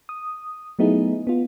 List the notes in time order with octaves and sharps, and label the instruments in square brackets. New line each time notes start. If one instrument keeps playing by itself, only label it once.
[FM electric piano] D#6
F#3 A3 B3 D#4 E4 G#4
B3 F4